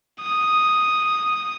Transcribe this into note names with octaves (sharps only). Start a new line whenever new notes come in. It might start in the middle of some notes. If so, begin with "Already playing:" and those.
D#6